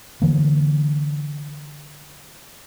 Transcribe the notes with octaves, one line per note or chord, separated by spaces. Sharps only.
D3 E3 F3 A#3